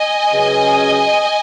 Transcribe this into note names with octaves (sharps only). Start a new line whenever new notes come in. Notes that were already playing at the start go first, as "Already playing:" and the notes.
Already playing: D#5 G#5
C#3 F#3 C#4 G#4 B4